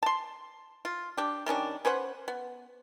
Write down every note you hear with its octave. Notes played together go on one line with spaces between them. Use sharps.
A5 C6
F4
D4 G4
D#3 G3 C#4 D4
C#4 B4 C5 F#5
B3